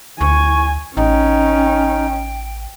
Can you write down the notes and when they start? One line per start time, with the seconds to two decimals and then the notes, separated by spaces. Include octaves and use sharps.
0.21 D2 G#5 C#6
0.97 A1 C#4 D#4 G5